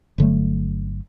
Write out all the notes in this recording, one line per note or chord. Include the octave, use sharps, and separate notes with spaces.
G1 D3 F#3 A3